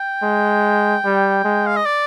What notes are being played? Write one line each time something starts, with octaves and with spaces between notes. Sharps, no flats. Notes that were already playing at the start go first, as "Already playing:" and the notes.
Already playing: G5
G#3
G3
G#3
F5
D#5
D5